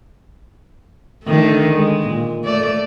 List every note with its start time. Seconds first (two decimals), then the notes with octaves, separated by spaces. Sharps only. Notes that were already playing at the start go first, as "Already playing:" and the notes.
1.24 D3 D#3 A3
1.74 G#3
2.03 A#2
2.44 A3 D5